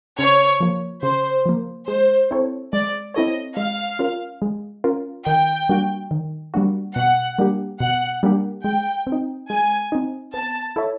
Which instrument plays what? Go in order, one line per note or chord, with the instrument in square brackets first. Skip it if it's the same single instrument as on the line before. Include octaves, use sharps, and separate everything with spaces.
[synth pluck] C#3 [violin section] C#5
[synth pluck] F3 A#3
[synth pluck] C#3 [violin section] C5
[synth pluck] F3 A#3
[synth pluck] G#3 [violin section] C5
[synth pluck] C4 E4 A4 C#5
[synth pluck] G#3 [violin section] D5
[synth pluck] C4 E4 A4 C#5 [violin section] D#5
[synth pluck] G#3 [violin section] F5
[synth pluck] C#4 F4 A#4
G#3
C#4 F4 A#4
[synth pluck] D#3 [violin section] G5
[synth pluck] G3 A#3 D4 F#4
D#3
G3 A#3 D4 F#4
[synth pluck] B2 [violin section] F#5
[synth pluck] G3 A#3 D4 G4
[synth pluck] B2 [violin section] F#5
[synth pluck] G3 A#3 D4 G4
[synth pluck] G#3 [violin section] G5
[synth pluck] C4
D#4
[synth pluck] G#3 [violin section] G#5
[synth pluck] C4 D#4
[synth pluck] B3 [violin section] A5
[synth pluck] E4 A4 C#5 E5